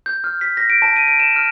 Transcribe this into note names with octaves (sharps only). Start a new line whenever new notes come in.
G6
F6
B6
A#6
D7
A5
D#7
D7
E7
F6